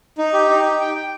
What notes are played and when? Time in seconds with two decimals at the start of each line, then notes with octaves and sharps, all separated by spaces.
0.18 D#4
0.33 G4
0.50 D#4
0.65 G4
0.80 G5
0.95 G5